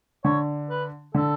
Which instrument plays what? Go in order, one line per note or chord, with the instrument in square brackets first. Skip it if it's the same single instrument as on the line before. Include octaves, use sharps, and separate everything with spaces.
[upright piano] D3 [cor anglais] C#5
[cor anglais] B4
[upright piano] D3 [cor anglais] A4